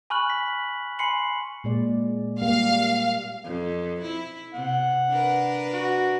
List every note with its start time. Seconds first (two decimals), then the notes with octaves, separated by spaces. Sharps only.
0.10 G#5 B5 C#6 F6 F#6 F#7
0.30 B6
0.99 G#5 B5 C6 C7 C#7 F#7
1.64 A#2 G#3 D5
2.42 G3 A#3 G4 F5
3.45 F2
4.03 E4
4.54 C3 F#5
5.09 D4 A#4 B4
5.73 F#4